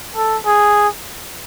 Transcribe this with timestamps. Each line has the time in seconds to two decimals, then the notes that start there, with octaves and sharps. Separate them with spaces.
0.16 A4
0.46 G#4